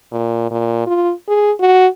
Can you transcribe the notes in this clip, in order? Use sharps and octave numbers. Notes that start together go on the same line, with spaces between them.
A#2
A#2
F4
G#4
F#4